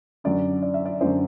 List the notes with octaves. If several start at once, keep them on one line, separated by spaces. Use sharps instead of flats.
F#2 D3 F#3 D5
D5
E5
D5
F#2 D3 F#3 C5